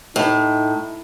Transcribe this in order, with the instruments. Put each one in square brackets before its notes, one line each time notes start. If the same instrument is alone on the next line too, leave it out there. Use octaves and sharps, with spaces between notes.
[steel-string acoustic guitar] A2 [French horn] D#4